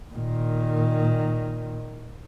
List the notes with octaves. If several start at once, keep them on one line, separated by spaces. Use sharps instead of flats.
A#2 D#3